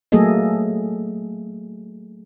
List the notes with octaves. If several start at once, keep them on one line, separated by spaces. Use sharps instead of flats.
F#3 A3 A#3 G#4 A4 D#5